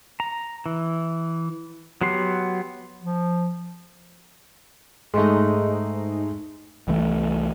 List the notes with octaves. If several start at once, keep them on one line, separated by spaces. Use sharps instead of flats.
A#5
E3
F#3 B3 G4 C6
F3
G#2 G#3 A3 D#4
C2 E3 A3